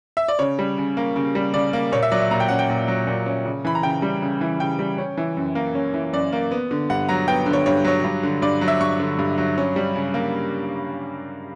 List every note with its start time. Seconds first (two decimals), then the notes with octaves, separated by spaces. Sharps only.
0.17 E5
0.28 D5
0.39 C#3 C#5
0.59 G3
0.78 C#3
0.97 A#3
1.16 C#3
1.35 G3
1.54 C#3 D5
1.73 A#3
1.92 A#2 C#5
2.03 E5
2.12 F#3 D5
2.21 E5
2.31 A#2 A#5
2.40 G5
2.48 C#4 F#5
2.59 G5
2.69 A#2
2.88 F#3
3.07 A#2
3.26 C#4
3.45 C#3
3.65 E3 B5
3.75 A#5
3.83 C#3 G5
4.02 G3
4.22 C#3
4.41 E3
4.60 C#3 G5
4.79 G3
4.98 C#4
5.17 E3
5.37 F#2
5.55 A#3
5.75 C#4
5.94 E3
6.13 F#2 D5
6.33 A#3
6.51 B3
6.71 D3
6.90 G2 F#5
7.09 F#3 A#5
7.28 B3 G5
7.46 D3
7.53 C#5
7.66 G2 C#5
7.85 F#3 C#5
8.04 G2
8.23 D3
8.42 G2 D5
8.61 F#3
8.68 E5
8.81 G2 C#6
9.00 D3
9.19 G2
9.38 F#3
9.58 C#4
9.76 G3
9.96 C#3
10.14 A#3